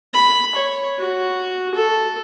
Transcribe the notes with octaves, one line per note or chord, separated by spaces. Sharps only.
B5
C#5
F#4
A4